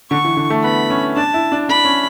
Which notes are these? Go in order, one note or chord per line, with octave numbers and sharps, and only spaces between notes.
D3 C#6
E3
D3
A3
B3 B5
C#4
D4 A5
E4
D4
D4 B5
C#4